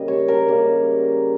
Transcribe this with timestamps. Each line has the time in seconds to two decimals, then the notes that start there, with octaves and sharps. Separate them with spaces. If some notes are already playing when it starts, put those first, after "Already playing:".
Already playing: C#3 G3 A#3 D#5
0.08 C#5
0.28 A#4
0.48 C#3 G3 A#3